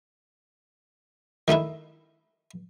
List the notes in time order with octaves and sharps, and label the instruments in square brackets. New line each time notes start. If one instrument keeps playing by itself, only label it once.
[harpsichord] D#3 A3 D#4 E4